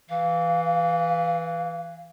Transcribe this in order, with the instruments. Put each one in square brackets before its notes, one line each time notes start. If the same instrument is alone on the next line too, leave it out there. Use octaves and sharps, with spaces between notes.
[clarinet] E3 [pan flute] F5